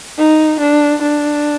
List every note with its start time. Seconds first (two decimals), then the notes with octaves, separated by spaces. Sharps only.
0.18 D#4
0.60 D4
1.02 D4